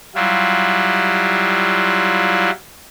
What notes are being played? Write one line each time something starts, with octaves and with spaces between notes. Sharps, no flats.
F#3 G3 E4 F4